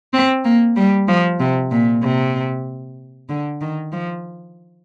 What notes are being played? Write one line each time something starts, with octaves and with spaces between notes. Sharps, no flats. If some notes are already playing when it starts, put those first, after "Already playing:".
C4
A#3
G3
F3
C3
A#2
C3
D3
D#3
F3